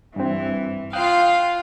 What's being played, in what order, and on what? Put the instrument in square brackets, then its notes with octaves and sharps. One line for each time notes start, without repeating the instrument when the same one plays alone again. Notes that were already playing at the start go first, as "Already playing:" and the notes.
[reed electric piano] G2 C4 [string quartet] E3
[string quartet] F4 F5 [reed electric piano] G5 D#6 F#6